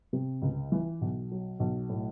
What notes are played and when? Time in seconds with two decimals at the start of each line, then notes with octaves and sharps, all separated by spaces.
0.13 C3
0.42 C#2
0.72 E3
1.01 B1
1.31 F#3
1.60 B1
1.89 A2